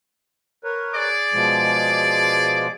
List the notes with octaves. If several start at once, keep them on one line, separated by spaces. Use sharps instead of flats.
A#4 B4 C#5
G#4 D5 D6
B2 F3 G#3